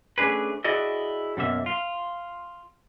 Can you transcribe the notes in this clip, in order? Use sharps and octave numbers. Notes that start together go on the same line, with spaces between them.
A3 C#4 D4 G#4 B4
E4 F#4 G#4 D5 D#5
F#2 B2 A#3 E5
F4